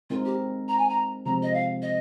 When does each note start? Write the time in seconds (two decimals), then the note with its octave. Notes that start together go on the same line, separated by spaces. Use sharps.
0.10 G#3 C4 D#4 F4 A#4
0.25 G4
0.68 A#5
0.78 G#5
0.89 A#5
1.25 C3 F3 G#3 C4 A#5
1.43 D#5
1.54 F5
1.82 D#5